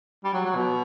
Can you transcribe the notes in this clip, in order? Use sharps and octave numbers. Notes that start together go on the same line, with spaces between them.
G3
F#3
F#3
B2